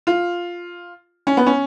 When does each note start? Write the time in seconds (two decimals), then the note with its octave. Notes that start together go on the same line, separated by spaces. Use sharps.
0.07 F4
1.27 C#4
1.37 B3
1.46 C#4